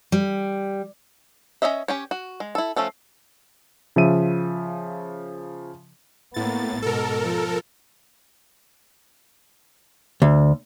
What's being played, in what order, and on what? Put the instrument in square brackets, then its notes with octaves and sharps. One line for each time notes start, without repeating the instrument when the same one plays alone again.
[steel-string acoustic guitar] G3
[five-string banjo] C#4 F4 C#5 D#5 E5
C#4 G4 C#5
F#4
G#3
E4 A4
F3 A3 C#4 A4
[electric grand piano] C#3 F3 E5 D#7
[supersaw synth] A2 A6 [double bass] A#3 B3
[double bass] G#2 B2 [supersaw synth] A4 A#4
[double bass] F3
[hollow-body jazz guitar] D2